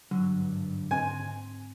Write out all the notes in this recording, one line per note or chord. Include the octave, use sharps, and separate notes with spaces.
G#1 G2 D3 F#3
G#2 C4 G#5